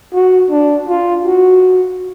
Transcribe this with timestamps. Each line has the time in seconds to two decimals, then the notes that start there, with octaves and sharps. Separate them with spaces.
0.13 F#4
0.50 D4
0.88 F4
1.26 F#4